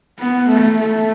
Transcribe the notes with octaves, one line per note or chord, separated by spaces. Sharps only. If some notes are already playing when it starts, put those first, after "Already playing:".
B3
A3
A3